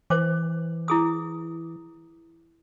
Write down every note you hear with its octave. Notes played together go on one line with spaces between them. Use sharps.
E3 C5 D6
E4 G#4 D#6